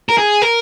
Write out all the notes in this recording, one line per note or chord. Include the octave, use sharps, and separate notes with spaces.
A#4
G#4
A#4